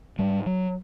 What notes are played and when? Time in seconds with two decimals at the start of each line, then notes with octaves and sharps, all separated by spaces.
0.19 G#2 G3
0.46 F#3